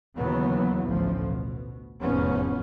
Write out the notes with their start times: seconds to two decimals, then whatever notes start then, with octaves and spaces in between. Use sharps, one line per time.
0.16 D#2 C#3 E3 F#3 B3
0.87 A1 D2 A2 F3
1.23 B2
2.02 F1 E2 G#2 F3 B3 C#4